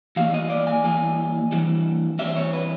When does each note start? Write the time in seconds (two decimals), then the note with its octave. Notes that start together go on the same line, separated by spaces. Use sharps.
0.16 E3 G3 A#3 F5
0.34 D#5
0.50 D5
0.67 G#5
0.84 E3 G3 A#3 G#5
1.52 E3 G3 C4
2.19 E3 G3 C4 E5
2.28 C5
2.36 C#5
2.53 B4